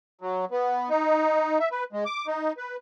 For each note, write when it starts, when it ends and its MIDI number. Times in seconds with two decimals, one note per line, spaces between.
0.21 0.45 54
0.51 0.89 59
0.89 1.59 63
1.60 1.69 76
1.71 1.84 71
1.92 2.04 56
2.05 2.27 86
2.27 2.53 63
2.57 2.76 71